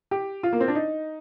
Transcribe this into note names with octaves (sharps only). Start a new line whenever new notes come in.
G4
F4
A#3
C4
D4
D#4